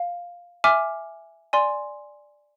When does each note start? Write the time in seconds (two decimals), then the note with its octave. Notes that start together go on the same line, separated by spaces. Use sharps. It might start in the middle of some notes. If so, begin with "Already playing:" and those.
Already playing: F5
0.64 E5 G#5 D6 F6
1.53 D5 G#5 C6